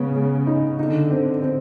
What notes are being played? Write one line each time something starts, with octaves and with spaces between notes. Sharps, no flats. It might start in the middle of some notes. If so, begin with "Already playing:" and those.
Already playing: C#3 G#3 B3
G#3
D#4
D3 D#4
C4
C4